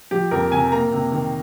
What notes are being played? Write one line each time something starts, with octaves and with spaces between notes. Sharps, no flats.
F3 G4
F2 A#4
C3 G#5
A#3 A#5
C3
D#3